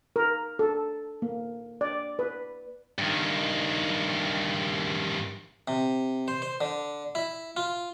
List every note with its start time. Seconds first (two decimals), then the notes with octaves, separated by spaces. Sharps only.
0.16 A#4
0.59 A4
1.22 A#3
1.81 D5
2.19 B4
2.98 G2 D#3
5.68 C3
6.28 C5
6.42 C5
6.61 D3
7.15 E4
7.57 F4